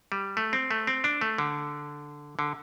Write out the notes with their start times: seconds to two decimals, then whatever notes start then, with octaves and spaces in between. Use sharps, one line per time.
0.12 G3
0.37 A3
0.53 C4
0.71 A3
0.87 C4
1.04 D4
1.21 A3
1.38 D3
2.39 D3